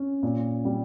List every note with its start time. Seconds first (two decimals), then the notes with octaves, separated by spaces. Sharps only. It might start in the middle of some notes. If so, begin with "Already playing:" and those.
Already playing: C#4
0.23 A#2
0.65 G3